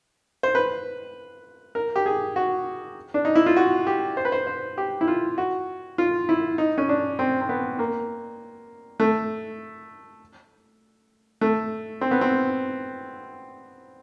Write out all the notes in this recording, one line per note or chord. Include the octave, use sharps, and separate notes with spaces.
C5
B4
A#4
G4
G#4
F#4
D4
D#4
E4
F4
F#4
G4
C5
B4
C5
C5
G4
E4
F4
F#4
F4
E4
D#4
C#4
D4
C4
C4
B3
A#3
A3
A3
C4
B3
C4